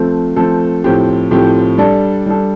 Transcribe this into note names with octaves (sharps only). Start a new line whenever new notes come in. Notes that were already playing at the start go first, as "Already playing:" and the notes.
Already playing: F3 A3 C4 A4
F3 A3 C4 A4
A2 F3 C4 G4
A2 F3 C4 G4
G3 D4 A4
G3 D4 A4